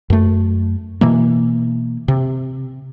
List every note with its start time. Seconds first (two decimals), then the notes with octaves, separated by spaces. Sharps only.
0.10 F#2 A3
1.01 B2 E3 A#3
2.08 C3